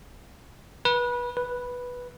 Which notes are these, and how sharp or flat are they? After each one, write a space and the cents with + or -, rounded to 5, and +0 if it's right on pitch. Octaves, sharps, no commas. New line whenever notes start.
B4 -25
B4 -5